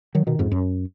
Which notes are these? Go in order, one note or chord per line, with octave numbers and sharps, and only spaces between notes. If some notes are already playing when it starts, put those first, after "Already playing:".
D#3 F#3
B2 D#3
F2 G#2
F#2